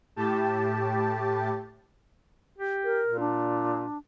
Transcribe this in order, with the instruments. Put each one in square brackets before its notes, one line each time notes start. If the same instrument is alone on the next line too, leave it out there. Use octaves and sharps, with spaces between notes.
[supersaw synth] A2 G4 A5
[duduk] G4
[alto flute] A#4
[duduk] A#2
[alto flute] D4